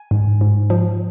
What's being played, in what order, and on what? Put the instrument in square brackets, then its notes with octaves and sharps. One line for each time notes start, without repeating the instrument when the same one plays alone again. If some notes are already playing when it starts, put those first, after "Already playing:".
Already playing: [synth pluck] G#5
G#2
G#2
F3